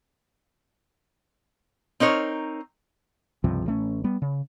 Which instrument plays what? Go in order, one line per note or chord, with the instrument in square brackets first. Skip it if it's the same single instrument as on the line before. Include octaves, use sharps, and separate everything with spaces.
[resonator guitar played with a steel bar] C4 D#4 A#4 C#5
[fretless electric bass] C#2 G2 C3 F3
A1 A3 C#4
G3 B3
C#3